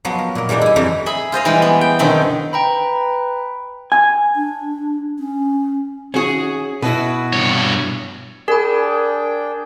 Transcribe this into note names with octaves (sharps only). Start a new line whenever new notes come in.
F3 F#3 B3
A#4
A#2 A#4
E3 G3 G#3 D4 D#4
E4 G#5
F2 E3 G3 D#4 A4
G#4 E5 B5
F4 C5 D#5 F5
E3 G3 G#3 B4
B3
G5
F#2 B2 D3 D#3 C4
B4 G5 A#5 B5
G#5
D4
C#4
D#3 C#4 F#4 G#4
B2 E4 F#4 B4
G2 C#5
D4 G#4 A#4 D5 G5 B5